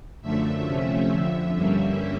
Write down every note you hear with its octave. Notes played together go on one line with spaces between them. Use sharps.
F#2 D3 F3 A3 E5
C3 F3 A3 C#4
F2 D3 F3
G2 D3 G3 A#3 C#4 E5